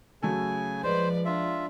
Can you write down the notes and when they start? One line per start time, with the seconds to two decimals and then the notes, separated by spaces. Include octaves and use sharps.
0.23 C#3 F#3 A3 A4 G#5
0.83 F3 G#3 B4 C5 D5
1.25 D4 F4 E5